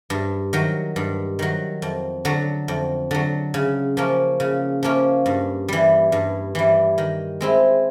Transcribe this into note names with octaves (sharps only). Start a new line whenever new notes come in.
G2
D#3 F#3
G2
D#3 F#3
F2
D3 F#3
F2
D3 F#3
C#3
F3 A#3 C#4
C#3
F3 A#3 C#4
G2
E3 G3
G2
E3 G3
D#3
G#3 C4 E4